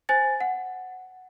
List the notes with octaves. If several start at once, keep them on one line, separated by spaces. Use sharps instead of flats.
C5 G#5 A6
F#5